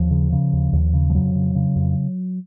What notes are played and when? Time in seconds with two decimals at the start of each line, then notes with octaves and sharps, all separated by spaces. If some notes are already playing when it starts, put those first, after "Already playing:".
Already playing: D#2 F3
0.11 C#3
0.32 C#3
0.53 D#2
0.73 D#2
0.93 C#3
1.10 F3
1.14 F2 F#3
1.35 C#3
1.55 C#3
1.76 F2